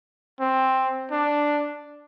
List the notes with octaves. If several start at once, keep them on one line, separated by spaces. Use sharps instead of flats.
C4
D4